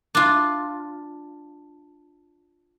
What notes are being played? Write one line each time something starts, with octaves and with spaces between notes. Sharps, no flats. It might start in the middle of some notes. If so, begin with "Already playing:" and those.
D4 F4